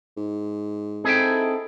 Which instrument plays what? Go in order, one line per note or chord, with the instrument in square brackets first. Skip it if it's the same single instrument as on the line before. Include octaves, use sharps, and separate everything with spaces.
[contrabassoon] G#2
[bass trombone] C4 [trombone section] D#4 E4 A4 [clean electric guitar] G#4 E5 G5